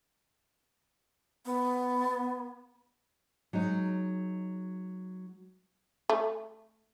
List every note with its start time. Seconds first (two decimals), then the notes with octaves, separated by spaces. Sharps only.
1.46 B3
3.53 F#3 G#3 D#4
6.09 A3